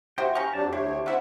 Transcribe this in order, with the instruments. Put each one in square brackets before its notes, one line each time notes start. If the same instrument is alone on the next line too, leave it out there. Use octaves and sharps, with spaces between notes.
[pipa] E4 F#4 C5 [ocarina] G4 [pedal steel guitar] G5
[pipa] C#4 C#6 [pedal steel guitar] F5 G5 A#5
[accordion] F2 F#3 D4 [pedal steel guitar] A5
[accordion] D2 C#5 [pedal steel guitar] D4 C5 [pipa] E4
[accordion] C4 E5 F#5 [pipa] E4 F4